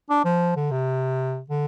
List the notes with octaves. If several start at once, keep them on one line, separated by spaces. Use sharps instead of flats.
D4
F3
D3
C3
D3